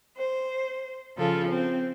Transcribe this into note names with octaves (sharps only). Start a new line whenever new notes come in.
C5
C#3 F3 F4 A4
C4